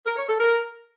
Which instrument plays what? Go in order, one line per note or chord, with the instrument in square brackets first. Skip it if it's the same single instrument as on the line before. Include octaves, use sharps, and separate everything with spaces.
[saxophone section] A#4
C#5
A4
A#4